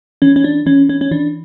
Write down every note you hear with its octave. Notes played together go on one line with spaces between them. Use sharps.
E3 C#4
C#4
D4
E3 C#4
C#4
C#4
E3 D4